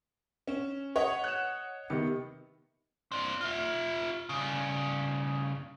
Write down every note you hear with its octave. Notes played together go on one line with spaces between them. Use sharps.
C#4 E7
B4 C#5 D#5 F#5
F#6 E7
C3 D#3 B3 C#7
C4 D4
F4 E5
G2 C#3